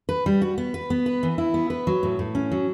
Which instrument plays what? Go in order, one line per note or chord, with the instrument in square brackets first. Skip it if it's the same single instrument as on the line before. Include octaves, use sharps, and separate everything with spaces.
[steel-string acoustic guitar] B4
G3
F#4
B3
B4
B3
B4
E3
E4
B3
B4
F#3
A2
A2
C#4
F#3